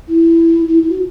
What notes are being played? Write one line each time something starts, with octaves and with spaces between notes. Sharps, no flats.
E4
E4
E4
F#4